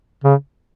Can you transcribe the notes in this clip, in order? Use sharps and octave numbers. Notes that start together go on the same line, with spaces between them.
C#3